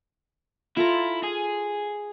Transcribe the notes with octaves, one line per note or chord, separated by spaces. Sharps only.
E4 F4 A4 A#5
G#4